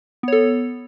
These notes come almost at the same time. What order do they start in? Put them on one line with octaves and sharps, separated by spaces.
B3 C#5 A4